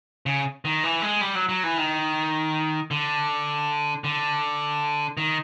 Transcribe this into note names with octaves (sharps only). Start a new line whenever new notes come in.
C#3
D#3
E3
G#3
G3
F#3
F#3
E3
D#3
D3
D3
D#3